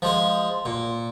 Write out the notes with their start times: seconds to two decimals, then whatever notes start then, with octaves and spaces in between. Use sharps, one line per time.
0.02 F3 G#3 G#4
0.65 A#2